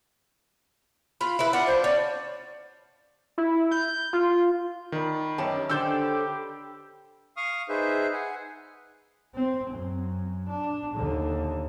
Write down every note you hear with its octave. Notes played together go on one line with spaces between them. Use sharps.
F4 B5
E4 B4
D4 F4 F#5
C5
C#4 D5
E4
G6
F4
D#3 D5 B5
F#2 C#4 D#4 G4 B4 A5
D3 G4 A4 C5 D5 D6 E6 G6
F5 C#6 D#6 F6
D#4 G#4 B4 C5 E5
F#5 G#5
C4
F#2
D4
D#2 D3